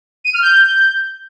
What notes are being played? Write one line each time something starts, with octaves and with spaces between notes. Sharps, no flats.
D#7
F6
G6